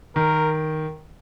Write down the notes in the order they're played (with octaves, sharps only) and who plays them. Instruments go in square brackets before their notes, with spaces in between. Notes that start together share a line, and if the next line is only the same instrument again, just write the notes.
[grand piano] D#3 [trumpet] A#4